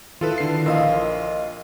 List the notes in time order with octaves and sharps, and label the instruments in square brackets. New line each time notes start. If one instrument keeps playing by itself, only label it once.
[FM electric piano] D#3 E4 [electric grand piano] F4 A4 B4
[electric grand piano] D3 C7
[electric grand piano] A#1 F4 E6 [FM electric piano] A#4 D#5 F5